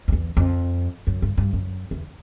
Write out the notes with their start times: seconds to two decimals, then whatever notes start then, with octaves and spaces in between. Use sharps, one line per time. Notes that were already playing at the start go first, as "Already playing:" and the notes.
0.08 F2
0.12 E2
0.37 F2
1.07 F#2
1.22 G2
1.37 G2
1.53 F#2
1.91 E2